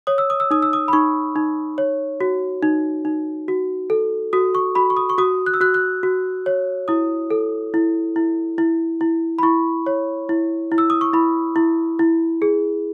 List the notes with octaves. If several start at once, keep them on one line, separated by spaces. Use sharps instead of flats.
C#5 D#6
E6
D#6
E6
D#4 D#6
E6
D#6
B5
D#4 C#6
D#4
C#5
F#4
D#4
D#4
F#4
A4
F#4 D#6
C#6
F#4 B5
C#6
D#6
C#6
F#4 D#6
F#6
E6
F#4 F#6
F#6
F#4
C#5
E4 D#6
A4
E4
E4
E4
E4
B5
E4 C#6
C#5
E4
E4
E6
D#6
C#6
E4 B5
E4
E4
G#4